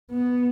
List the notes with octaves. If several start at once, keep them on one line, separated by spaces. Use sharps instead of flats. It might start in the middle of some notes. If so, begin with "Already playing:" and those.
B3